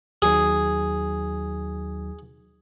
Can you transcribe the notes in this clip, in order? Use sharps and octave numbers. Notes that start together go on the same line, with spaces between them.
D#2 F#3 D#4 G#4